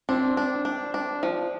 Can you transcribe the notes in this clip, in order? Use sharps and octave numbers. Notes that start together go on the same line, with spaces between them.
C4 D4
D4
D4
D4
F3